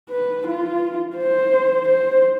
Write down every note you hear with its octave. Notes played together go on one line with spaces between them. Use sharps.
B4
F4
C5
C5